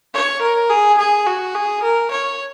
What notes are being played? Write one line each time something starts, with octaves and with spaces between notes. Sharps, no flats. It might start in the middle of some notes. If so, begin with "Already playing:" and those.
C#5
A#4
G#4
G#4
F#4
G#4
A#4
C#5